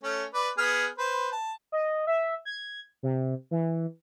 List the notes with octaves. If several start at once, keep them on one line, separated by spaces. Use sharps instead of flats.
A3 C#4
B4 D5
B3 G#4 F6
B4 C5
A5
D#5
E5
G#6
C3
E3